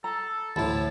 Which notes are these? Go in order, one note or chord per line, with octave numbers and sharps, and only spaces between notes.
A4 A#5
D2 A2 E4 A5 B5